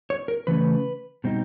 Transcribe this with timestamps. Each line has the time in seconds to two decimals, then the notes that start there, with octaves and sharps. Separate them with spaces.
0.10 C#5
0.28 A#4
0.47 C#3 E3 A3 C#4 B4
1.24 B2 G3 C4 D#4